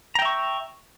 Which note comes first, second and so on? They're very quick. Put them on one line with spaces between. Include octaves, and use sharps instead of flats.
A#5 G5 E5 C#6